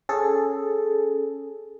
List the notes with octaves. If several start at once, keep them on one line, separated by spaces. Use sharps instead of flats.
C#4 G#4 A4